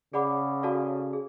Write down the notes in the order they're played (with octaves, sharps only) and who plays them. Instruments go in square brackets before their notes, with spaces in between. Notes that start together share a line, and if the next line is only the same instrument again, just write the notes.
[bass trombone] C#3 [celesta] G#4 D5 F#5 B5 D6
[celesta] F#4 A4 D5 F5 A5
G#4